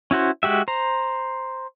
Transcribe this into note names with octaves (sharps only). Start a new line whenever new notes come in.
C#4 E4 F#4 C5
G#3 F#4 G4 E5
C5 A#5